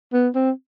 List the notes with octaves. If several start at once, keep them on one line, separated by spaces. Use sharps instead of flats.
B3
C4